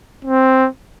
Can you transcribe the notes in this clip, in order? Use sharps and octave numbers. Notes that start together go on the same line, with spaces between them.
C4